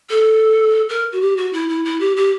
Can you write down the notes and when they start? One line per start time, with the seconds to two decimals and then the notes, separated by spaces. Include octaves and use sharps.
0.10 A4
0.89 A#4
1.12 F#4
1.21 G4
1.37 F#4
1.53 E4
1.69 E4
1.85 E4
2.00 G4
2.17 G4